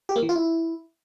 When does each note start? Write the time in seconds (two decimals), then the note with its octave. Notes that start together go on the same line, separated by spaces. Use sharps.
0.09 G4
0.16 A#3
0.22 E3
0.29 F4
0.36 E4